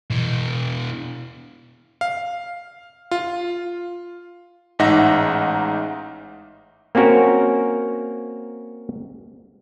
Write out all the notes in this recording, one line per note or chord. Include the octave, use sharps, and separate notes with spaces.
B2 E3
F5
F4
A1 G#2 D#4 E5 F#5 A#6
A#3 C4 C#4 F#4 A#4